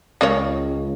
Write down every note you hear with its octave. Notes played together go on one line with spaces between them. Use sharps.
C#2 C#3 A#4 C#5